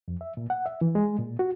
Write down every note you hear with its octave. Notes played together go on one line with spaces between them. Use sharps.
F2
E5
A#2
F#5
E5
E3
G#3
A#2
F#4